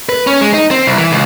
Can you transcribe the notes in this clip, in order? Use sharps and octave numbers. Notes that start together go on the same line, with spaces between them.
B4
C#4
G#3
D#4
C4
C2
E3
C#2